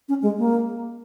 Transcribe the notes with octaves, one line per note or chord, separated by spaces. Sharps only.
C#4
G#3
A#3